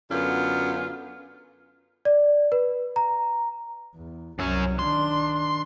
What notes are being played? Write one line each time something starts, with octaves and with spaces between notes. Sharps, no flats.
F#2 D3 B3 F4
D5
B4
A#5
E2
C2 F#2 F#3 C#4
D#3 D4 C6